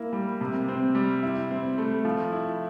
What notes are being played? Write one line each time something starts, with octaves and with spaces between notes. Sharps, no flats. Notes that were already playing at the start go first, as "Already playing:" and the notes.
Already playing: A#3 E4
G3
C3
C4
G3
E4
C4
A3
F3
E4